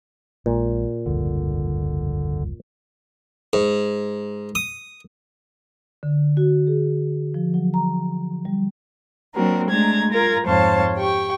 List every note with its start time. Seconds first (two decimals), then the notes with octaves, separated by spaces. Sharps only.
0.46 A#1 A#2 G#3
1.06 F1 C#2 G2 D3
3.53 G#2
4.55 D#6
6.03 D3
6.37 F#4
6.67 G#4
7.34 F3
7.54 F#3
7.74 A#5
8.45 G3
9.35 F#3 A#3 C4 D4 F#4 A#4
9.70 G#3 A3 D4 A#5 G#6
10.10 F4 A#4 A#5 G#6
10.46 F2 G#2 C5 C#5 F5 A5
10.97 G4 G5 C#6